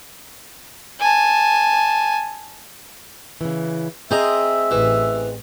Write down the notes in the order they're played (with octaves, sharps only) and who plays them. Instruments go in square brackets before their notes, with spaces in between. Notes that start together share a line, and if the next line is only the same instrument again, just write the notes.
[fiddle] G#5 A5
[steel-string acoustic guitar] C#3 E3
[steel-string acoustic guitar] C4 G#4 D#5 [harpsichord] C5 A#5 [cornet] E5
[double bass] A1 [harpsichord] E3